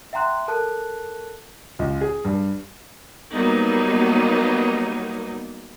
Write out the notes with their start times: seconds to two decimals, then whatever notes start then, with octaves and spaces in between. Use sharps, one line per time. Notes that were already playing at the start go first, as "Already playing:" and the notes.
0.13 E5 F#5 G5 A#5 C6 F#6
0.48 A4 A#4 A5 F#6
1.79 C#2
2.01 G#4
2.25 G2
3.32 F#3 G3 A#3 B3 D#4